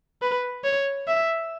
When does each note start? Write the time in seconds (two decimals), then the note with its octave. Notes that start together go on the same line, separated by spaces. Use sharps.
0.22 B4
0.64 C#5
1.08 E5